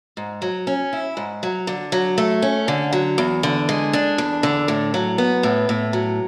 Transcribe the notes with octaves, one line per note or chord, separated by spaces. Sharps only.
G#2
F#3
C#4
E4
G#2
F#3
D3
F#3
A3
C#4
D3
F#3
E2
D3
G#3
D4
E2
D3
A2
F#3
B3
A2
A2
F#3